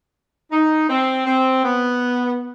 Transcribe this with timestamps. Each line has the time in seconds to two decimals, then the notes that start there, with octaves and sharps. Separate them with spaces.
0.52 D#4
0.89 C4
1.26 C4
1.64 B3